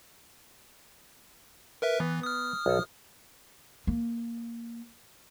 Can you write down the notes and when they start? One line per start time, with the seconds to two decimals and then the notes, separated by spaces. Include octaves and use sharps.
1.82 A#4 B4 E5
2.00 E3 B3
2.23 D#6 F6
2.66 B1 A4
3.87 A#3